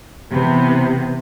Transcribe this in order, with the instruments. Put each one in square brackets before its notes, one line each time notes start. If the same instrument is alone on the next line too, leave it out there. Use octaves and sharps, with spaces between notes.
[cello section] C3 E3 B3